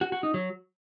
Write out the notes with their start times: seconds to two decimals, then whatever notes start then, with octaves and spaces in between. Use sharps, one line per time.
0.01 F#4
0.12 F#4
0.23 D#4
0.34 F#3